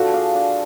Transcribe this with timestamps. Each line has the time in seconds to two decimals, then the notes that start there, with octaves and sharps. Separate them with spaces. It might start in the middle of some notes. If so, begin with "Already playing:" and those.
Already playing: F3 D4 F#4 A4
0.13 G#4 D5 F5
0.35 D4